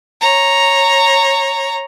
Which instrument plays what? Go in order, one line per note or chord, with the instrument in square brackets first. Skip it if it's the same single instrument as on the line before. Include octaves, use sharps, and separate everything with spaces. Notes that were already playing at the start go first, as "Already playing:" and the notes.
[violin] C#5 A#5